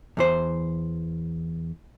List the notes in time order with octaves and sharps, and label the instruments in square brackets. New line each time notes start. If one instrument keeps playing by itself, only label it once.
[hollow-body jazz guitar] E2 E3 C5